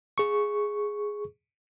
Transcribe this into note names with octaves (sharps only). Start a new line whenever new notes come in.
G#4 C#6